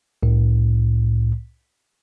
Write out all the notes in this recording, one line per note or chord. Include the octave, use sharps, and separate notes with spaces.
C2 A2